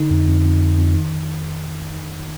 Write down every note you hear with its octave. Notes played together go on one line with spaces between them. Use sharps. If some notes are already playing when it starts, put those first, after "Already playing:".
Already playing: D3 D#4
F2
F2
F2
F2
F2
D#3